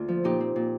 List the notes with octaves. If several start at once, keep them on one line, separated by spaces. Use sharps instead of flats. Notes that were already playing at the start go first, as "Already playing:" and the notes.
Already playing: D2 A#3 D4 F4
F3
A#2 D#4 G4
C4
A#2